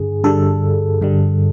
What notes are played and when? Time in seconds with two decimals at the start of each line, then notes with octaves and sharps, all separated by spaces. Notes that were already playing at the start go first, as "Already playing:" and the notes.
Already playing: G2 D3 G#4
0.24 G2 D3 G3 A4
1.01 G2 D3 G3